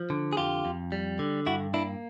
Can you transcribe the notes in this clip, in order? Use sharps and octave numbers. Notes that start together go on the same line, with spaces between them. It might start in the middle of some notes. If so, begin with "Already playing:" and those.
Already playing: F3
D3
G#4
F2 F4 G4
F2
G3
D3
G2 E4 F#4
A#3 D4 E4